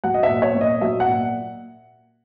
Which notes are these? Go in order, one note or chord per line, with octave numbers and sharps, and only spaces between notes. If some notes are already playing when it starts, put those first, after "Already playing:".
F#3 F#5
D#5
E5
A#2
C#5
A#2
D#5
F#3 E5
F#5
A#2